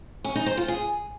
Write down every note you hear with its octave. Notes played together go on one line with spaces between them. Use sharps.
C#4
D#4
C5
F4
G#4